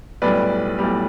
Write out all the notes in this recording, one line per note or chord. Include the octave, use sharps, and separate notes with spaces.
B1 A2 G3 B4 D5
B1 A2 G3